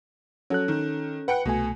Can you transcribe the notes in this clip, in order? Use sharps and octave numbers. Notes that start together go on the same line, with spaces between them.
F#3 C#4 A4 F#6
D#3
B4 F#5 G5 C#7
C2 B2 A3 G#5